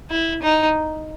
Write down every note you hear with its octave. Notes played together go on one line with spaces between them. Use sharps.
E4
D#4